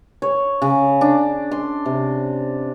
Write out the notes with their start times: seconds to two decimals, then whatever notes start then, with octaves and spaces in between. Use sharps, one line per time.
0.22 C#5
0.62 C#3
1.01 D4
1.51 C6
1.86 C3